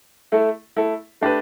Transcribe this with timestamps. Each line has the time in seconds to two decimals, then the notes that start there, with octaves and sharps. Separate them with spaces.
0.32 A3 E4 A4
0.76 A3 E4 A4
1.21 A3 D4 G4 B4